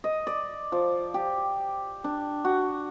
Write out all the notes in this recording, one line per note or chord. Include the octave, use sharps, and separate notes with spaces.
D#5
D5
F3
G4
D4
F#4